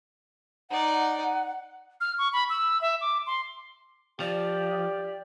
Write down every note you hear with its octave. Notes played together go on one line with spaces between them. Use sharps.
D#4 D5 F#5
F6
C#6
B5
E6
E5
D6
C6
F3 G4 D5